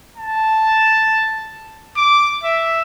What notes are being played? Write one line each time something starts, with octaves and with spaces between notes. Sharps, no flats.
A5
D6
E5